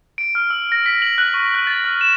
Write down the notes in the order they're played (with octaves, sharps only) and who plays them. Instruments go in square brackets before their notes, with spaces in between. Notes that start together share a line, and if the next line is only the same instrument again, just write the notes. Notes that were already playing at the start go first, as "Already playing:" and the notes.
[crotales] D7
F6
E6
A#6
B6
F#7
F#6
C#6
F#6
A6
F6
E7